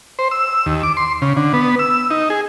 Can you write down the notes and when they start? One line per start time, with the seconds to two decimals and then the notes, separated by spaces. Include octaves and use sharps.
0.19 C5
0.31 E6
0.66 D#2
0.83 D6
0.97 C6
1.22 C#3
1.37 D3
1.53 B3
1.79 E6
2.11 D#4
2.30 G#4